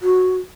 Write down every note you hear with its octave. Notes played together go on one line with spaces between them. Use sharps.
F#4